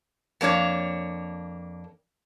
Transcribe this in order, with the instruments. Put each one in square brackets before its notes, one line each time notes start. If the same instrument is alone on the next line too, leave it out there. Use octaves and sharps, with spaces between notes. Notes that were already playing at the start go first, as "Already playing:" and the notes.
[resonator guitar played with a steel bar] F2 A#3 D4 C#5